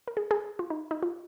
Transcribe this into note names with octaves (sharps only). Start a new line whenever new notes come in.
A#4
G#4
G#4
F4
D#4
D#4
F4